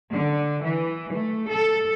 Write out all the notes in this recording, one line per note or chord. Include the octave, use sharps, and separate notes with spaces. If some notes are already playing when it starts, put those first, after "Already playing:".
D3
E3
A3
A4